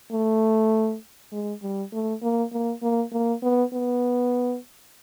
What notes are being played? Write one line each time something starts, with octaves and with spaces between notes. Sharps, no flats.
A3
G#3
G3
A3
A#3
A#3
A#3
A#3
B3
B3